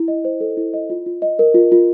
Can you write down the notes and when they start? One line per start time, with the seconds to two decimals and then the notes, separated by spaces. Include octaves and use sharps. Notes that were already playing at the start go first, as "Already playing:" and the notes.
Already playing: E4
0.08 D#5
0.25 C5
0.41 A4
0.57 E4
0.74 D#5
0.90 F4
1.06 F4
1.22 D#5
1.39 A#4
1.54 F4
1.72 F4